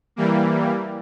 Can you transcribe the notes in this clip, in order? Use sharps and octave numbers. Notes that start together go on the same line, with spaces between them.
E3 G3 A#3